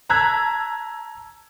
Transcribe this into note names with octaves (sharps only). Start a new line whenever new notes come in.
A5 A#5 E6 F#6 G#6 B6